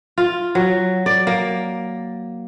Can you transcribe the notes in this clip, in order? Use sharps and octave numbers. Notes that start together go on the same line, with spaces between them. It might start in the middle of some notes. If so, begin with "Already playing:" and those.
F4
F#3
D5
A#3